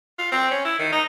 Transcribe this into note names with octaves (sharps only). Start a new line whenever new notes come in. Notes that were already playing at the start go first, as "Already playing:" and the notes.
F4
C4
C#4
E4
D#3
D#4